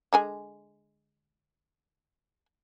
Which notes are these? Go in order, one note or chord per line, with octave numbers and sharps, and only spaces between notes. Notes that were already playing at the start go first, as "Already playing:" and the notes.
D3 G#3 G#5